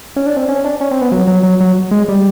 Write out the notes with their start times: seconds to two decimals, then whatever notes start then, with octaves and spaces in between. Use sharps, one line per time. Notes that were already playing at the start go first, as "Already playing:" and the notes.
0.16 C#4
0.26 D4
0.37 C4
0.49 C#4
0.64 D4
0.81 C#4
0.91 C4
1.01 B3
1.12 F#3
1.27 F#3
1.43 F#3
1.61 F#3
1.91 G#3
2.09 G3